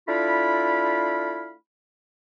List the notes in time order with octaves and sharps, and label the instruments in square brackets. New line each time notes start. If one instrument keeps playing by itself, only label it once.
[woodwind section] A3 D4 E4 F4 F5 B5